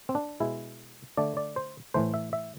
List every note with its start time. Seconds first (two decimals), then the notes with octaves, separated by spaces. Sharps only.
0.09 C4
0.15 D4
0.40 B2 G#3 E4
1.17 D3 A3 D5
1.37 D5
1.56 C5
1.94 A2 E3 A3 C5
2.14 E5
2.33 E5